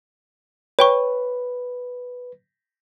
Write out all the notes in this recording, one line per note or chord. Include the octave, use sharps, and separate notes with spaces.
B4 C#5 G5 C#6